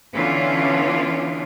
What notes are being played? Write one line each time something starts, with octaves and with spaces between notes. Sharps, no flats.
D3 E3 B3 C#4 D4 F4